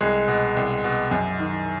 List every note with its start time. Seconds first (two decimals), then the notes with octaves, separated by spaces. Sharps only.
0.01 C2 G#3
0.28 B2
0.57 C2
0.84 B2
1.11 F#2
1.40 D#3